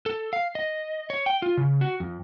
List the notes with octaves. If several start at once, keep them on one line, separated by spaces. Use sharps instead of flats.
A4
F5
D#5
C#5
G5
F4
C#3
F#4
F2